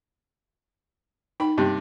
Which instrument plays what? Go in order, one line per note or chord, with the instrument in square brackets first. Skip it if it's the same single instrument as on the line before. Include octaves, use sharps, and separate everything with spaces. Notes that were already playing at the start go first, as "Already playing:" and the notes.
[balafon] D#4 G5 [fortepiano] B5
[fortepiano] G2 C3